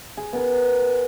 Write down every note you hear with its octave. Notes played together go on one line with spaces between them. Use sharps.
G#4
B3 A#4 A#5